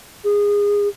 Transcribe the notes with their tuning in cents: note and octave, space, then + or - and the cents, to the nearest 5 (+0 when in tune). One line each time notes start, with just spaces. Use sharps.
G#4 -20